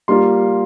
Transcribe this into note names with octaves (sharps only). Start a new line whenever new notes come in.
G3 A#3 F4 C6